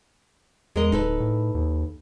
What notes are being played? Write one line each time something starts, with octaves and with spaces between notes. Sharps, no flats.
E2 G#3 A#4 D#5
D1 D#4 A4 B4
A2
D#2